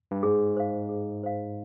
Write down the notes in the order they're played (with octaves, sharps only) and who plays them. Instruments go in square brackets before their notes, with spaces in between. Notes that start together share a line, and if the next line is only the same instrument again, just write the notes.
[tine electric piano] G2
[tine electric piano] G#2 [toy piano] G#4
[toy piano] C5 F5
G#4
C5 F5